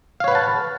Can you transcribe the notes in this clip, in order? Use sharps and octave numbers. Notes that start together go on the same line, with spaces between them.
B4 C#5 F5 F#5 A5